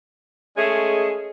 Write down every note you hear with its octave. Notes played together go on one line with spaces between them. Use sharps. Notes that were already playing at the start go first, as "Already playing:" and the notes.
G#3 A3 C#4 G#4 D#5